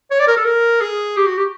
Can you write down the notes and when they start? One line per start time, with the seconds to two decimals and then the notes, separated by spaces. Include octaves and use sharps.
0.11 C#5
0.20 D5
0.27 A#4
0.37 A4
0.45 A#4
0.81 G#4
1.17 G4
1.26 F#4
1.38 G4